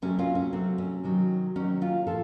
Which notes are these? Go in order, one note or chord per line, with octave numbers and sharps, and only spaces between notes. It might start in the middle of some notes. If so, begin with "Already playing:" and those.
C3 F#3 A3 C#4
C#4 F4
C#4
C3 F#3 A3 C4
C#4
C3 D#3 F#3
C3 D#3 F#3 C#4
C#4 F4
A2 F3 F4 A4